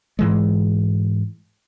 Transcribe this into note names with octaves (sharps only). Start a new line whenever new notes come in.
G#2 E3 G#3